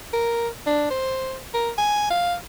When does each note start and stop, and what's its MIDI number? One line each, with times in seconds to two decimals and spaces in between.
0.13 0.48 70
0.66 0.88 62
0.90 1.38 72
1.54 1.70 70
1.78 2.10 80
2.10 2.35 77